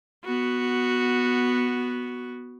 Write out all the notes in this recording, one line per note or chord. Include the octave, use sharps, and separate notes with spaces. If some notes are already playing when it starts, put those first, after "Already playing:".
B3 F#4